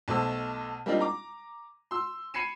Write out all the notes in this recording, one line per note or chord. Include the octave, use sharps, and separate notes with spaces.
B1 B2 A3 C5 A5 E6
G3 A#3 C4 D4 D#4 F4
A#5 D6
C6 E6
B5 G#6 C7 C#7 D#7 E7